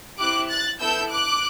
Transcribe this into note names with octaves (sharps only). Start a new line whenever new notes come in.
C4 E4 G4 D6 F#6
F#6 A6
B3 E4 A4 E6 G6
D6 F#6